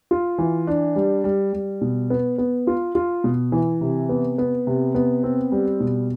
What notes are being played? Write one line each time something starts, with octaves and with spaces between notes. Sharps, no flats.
F4
E3
D4
G3
G3
G3
B2
B3
B3
F4
F4
B2
E3
C3
B3
B3
C3
B3
C4
G3
B2